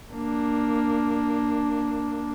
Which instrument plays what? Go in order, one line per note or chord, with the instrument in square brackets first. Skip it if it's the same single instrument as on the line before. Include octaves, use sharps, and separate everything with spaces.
[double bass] A#3 D4